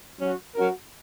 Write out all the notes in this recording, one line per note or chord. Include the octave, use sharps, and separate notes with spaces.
F#3 C#4 F#4
F#3 C#4 F#4 A#4